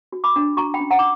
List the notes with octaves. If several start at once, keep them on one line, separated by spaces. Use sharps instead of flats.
F#4
B5 D6
D4
F#4 A#5 C#6
G5 B5
C#4
F#5 A#5
D6